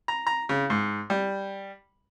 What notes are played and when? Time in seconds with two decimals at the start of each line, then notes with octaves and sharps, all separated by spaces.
0.08 A#5
0.27 A#5
0.49 C#3
0.70 G#2
1.10 G3